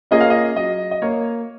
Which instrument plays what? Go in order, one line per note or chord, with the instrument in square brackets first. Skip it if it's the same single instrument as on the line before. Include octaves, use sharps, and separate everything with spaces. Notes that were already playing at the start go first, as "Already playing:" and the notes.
[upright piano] A#3 C#4 F4 G#4 [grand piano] D#5
[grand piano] F5
D#5
[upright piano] F#3 [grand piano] D#5
[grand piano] D#5
[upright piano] A#3 [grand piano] C#5